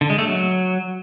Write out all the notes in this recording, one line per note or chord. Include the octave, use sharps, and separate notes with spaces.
D3
G#3
A3
F#3